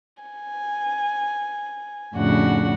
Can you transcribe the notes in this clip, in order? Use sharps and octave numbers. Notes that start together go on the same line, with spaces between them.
G#5
F2 A2 C#3 D4 F#4 F#5